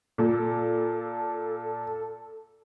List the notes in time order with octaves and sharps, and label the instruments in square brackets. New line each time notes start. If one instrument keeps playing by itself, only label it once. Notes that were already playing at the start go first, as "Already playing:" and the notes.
[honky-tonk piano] A#2 [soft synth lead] A4